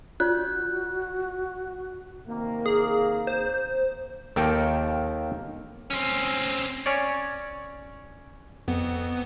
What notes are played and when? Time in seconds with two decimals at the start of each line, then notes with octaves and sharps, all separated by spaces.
0.20 F4 F#4 D5 F#6 G6
2.28 C3 D#3 A#3
2.66 G#4
3.27 C5
4.36 D#2 D#3 A#3 A4 A#4 G5
5.90 C4 C#4
6.86 C#4 C#5 D5
8.68 F2 B3